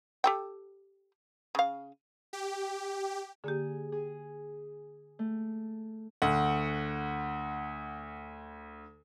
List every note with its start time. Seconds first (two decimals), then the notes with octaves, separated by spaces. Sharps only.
0.24 G4 A4 G5
1.55 C#3 F5
2.33 G4
3.44 D3 A#3 G4 G#4
3.92 G#4
5.19 A3
6.22 D2 F#5